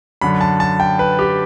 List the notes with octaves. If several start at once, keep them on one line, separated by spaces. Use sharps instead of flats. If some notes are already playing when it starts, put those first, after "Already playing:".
F#2 D3 B5
A5
A5
G5
B4
G4